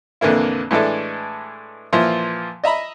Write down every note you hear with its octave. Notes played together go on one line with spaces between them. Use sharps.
F2 A#2 D3 E3 A#3 E4
A2 E3 G#3 D4 E4 A4
A#2 E3 F3 E4 F4
D#5 E5 A#5 B5